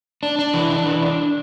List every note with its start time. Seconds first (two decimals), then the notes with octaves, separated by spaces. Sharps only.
0.23 D4
0.39 D4
0.54 E3
0.70 D4
0.86 E3
1.02 D4